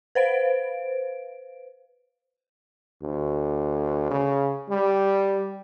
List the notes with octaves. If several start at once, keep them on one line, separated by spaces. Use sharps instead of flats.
B4 C5 F5 D7
D2
C#3
G3